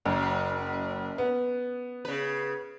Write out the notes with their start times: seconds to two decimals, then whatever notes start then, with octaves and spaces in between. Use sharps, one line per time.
0.05 F#1 F#2
1.18 B3
2.05 C#3 B4